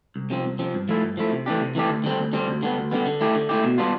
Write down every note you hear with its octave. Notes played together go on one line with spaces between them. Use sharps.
C2
C3 F3 C4
C2
C3 F3 C4
G2
F3 A3 E4
G2
F3 A3 E4
C3
E3 A3 D4 G4
C3
E3 A3 D4 G4
D2
D3 G3 C4
D2
D3 G3 C4
D2
D3 G3 B3
D2
D3 G3 B3
D3
A3 E4 G4
D3
A3 E4 G4
B2
G3 B3 D4 F4